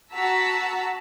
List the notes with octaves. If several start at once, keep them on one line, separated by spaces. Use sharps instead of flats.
F#4 A5 A#5 E6 B6